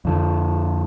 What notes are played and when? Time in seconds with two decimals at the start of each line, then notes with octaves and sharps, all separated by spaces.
0.05 F2 D3